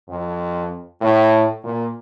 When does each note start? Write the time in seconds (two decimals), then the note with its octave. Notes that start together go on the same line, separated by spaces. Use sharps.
0.09 F2
1.01 A2
1.64 A#2